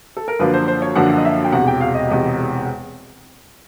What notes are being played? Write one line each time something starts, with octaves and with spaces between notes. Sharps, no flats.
A4
A#4
F#2 D3 F3 A#3 D4 B4
C5
C5
C#5
F#2 D3 F3 A#3 D4 F#5
F#5
D#5
E5
G5
E1 E2 C3 F#5
G5
F5
D#5
E1 E2 C3